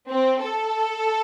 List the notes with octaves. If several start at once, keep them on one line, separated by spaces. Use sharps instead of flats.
C4
A4